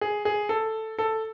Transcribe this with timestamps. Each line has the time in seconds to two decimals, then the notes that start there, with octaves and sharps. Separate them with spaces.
0.01 G#4
0.25 G#4
0.49 A4
0.98 A4